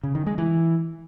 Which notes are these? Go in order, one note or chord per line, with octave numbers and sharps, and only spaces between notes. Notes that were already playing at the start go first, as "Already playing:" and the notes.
C#3
D#3
G#3
E3